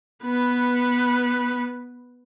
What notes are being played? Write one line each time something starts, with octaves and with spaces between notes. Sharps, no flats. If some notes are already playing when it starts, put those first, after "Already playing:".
B3 B4